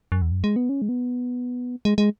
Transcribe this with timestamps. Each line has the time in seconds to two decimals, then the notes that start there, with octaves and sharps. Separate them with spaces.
0.12 F#2
0.22 E2
0.31 F#2
0.44 G#3
0.56 B3
0.69 C#4
0.82 G#3
0.89 B3
1.85 G#3
1.98 G#3